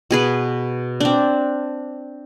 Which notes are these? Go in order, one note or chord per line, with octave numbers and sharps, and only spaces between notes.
B2 G#4 B4
C4 D4